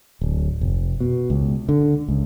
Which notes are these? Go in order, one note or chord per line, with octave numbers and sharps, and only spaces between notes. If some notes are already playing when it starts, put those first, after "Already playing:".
D1
F1
B2
C#2
D3
C#2